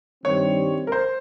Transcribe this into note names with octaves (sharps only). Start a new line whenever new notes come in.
G2 D#3 G3 C4 C#5
A#4
C5